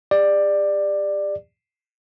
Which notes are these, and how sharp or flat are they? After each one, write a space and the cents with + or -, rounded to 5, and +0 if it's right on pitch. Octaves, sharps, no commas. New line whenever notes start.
G4 +45 D5 +15